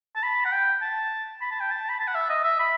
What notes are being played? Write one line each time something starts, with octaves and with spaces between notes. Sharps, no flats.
A5
B5
F#5
G5
A5
B5
A5
G5
A5
B5
A5
F#5
E5
D#5
E5
B5